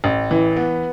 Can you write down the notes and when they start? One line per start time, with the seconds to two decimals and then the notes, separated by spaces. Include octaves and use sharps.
0.04 A1
0.31 E3
0.56 B3